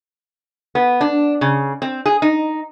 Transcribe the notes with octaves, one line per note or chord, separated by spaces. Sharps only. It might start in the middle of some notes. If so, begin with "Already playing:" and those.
B3
D4
C#3
C4
G#4
D#4